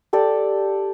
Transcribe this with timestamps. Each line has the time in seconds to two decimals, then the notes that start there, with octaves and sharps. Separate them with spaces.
0.13 G4 A4 D5